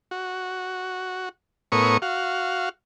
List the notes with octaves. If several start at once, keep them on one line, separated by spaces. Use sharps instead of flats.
F#4
A2 B3 A#4 C#5 C#6 D#6
F#4 F5